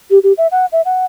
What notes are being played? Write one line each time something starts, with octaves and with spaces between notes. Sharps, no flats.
G4
G4
E5
F#5
E5
F#5